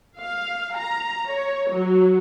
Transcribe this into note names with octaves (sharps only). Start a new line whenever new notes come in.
F5
A#5
C#5
F#3